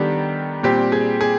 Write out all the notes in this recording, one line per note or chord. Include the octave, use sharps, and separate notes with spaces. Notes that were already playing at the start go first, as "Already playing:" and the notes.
Already playing: D#3 G3 B3 D4 G4 A4
A#2 G3 C4 G4
G#4
G#4